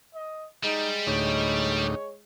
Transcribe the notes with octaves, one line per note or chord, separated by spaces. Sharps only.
D#5
G3 G#3 D#4
D2 A2 D#4 C#5